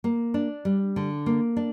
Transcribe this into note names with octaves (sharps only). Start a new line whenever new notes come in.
A#3
D4
G3
D3
A#3
D4